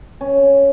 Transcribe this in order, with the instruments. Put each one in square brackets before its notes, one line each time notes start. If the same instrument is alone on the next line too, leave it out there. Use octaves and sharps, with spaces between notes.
[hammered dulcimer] C#4